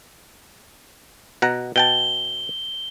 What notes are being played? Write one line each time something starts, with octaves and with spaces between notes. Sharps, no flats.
B2 F#5 A#5
B2 G5 A5 G7